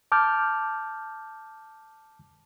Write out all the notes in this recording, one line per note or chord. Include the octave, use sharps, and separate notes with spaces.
A5 D6 F6 G6